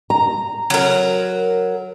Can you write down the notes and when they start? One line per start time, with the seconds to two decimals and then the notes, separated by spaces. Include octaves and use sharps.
0.10 A#5
0.70 F#3 A#4